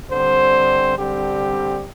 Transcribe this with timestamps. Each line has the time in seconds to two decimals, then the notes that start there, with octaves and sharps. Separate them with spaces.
0.10 D3 G3 C4 C5
0.97 D3 G3 C4 G4